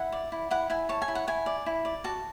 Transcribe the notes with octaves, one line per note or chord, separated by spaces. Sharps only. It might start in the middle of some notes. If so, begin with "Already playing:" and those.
Already playing: E4 F#5
D5
E4
E4 F#5
E4 G#5
C#5 A5
G#5
E4
F#5
E4 G#5
D5
E4
D5
F#4 A5